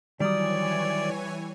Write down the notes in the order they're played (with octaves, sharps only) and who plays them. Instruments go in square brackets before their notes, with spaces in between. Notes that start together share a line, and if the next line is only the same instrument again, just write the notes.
[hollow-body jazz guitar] D#3 F#3 [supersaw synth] E3 C#5 G#5 [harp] G3 D#6 [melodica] D5